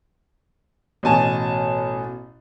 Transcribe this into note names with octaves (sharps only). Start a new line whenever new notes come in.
A1 B2 G#5 A5